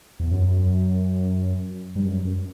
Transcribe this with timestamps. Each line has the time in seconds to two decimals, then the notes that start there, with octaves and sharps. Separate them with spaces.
0.20 E2
0.32 F#2
1.96 G2
2.05 F#2
2.25 F#2